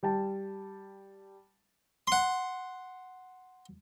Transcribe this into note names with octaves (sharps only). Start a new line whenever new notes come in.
G3 G5 A5
F#5 C6